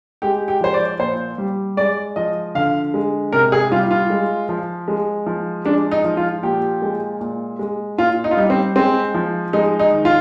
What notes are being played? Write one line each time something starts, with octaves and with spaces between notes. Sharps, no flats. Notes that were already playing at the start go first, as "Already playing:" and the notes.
G#3 G4
G4
F3 C5
D5
A#2 C5
G3
G#3 D5
F3 D#5
D3 F5
G#3
C3 A#4
G#4
G3 F4
F4
G#3
F3
G#3
F3
G#3 D4
D#4
F3
F4
A#2 G4
G#3
A#2
G#3
A#2 F4
D#4
F4
G3 D#4
C4
G#3 C4
F3
G#3 D#4
D#4
D#3
F4